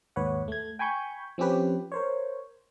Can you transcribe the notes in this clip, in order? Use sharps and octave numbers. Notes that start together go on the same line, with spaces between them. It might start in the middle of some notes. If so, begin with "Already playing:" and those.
D#2 G#2 B4 C#5 F#5
A3 G#6
G5 G#5 B5 C#6 G6
F3 C4 C#4 G4 B4
A#4 C5 C#5